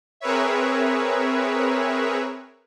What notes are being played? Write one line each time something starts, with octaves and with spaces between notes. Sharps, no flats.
C4 G#4 A#4 B4 C#5 E5